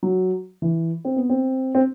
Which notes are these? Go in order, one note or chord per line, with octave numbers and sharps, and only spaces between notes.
F#3
E3
C4
B3
C4
C4